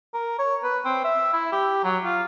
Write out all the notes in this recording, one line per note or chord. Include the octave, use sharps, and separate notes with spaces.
A#4
C#5
B4
C4
E5
E4
G4
F#3
F4